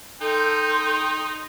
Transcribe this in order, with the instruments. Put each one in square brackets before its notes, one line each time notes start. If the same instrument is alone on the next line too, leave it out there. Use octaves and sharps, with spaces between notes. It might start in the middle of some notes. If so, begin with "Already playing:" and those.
[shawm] D#4 [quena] A4 [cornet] G5 [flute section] C6 G6